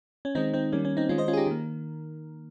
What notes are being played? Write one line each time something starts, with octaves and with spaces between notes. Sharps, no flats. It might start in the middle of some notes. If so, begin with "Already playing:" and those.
C#4
D#3 G#3 C4 D#4
C4 D#4
D#3 G3 A#3 C#4
C#4
C4 D#4
D#3 G#3 C#4 F4
C5 D#5
C#4 F4
G#4
D#4 G4
D#3 A#3